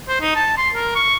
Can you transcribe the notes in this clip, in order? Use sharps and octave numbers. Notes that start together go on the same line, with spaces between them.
C5
D#4
A5
C6
A#4
C#6